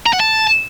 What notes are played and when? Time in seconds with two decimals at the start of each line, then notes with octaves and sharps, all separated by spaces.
0.06 A#5
0.13 F#5
0.20 A5